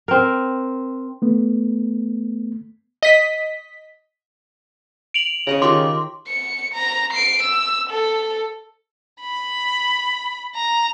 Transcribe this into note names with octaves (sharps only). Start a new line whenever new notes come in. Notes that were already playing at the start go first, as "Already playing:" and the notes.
C4 A#4
A3 B3
D#5 B6
D7 F7 F#7
C#3 C#5 D#5 A#5
D#3 F4 G4 C6 D6
C#7
A#5
C7 D7
E6
A4
B5
A#5